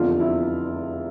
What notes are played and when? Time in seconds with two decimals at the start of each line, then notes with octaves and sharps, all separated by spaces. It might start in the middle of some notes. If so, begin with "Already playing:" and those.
Already playing: F1 E2 D3 F4
0.20 E4